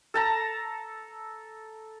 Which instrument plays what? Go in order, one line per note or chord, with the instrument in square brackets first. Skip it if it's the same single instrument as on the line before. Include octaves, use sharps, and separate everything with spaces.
[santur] A4 A5 A#5